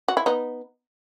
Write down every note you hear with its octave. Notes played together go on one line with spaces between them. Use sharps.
F#4
E4
B3 D#4